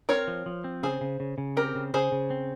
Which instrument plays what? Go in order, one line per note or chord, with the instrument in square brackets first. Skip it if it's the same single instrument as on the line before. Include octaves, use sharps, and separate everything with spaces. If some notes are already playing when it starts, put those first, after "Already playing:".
[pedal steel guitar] C4 [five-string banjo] A#4 C#5
[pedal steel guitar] F3
F3
C4
[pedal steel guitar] C#3 [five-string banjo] G#4 C5
[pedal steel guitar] C#3
C#3
C#3
[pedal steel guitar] C4 [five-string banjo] G4 A#4
[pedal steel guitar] C#3
[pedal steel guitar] C#3 [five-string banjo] G#4 C5
[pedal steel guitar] C#3
C4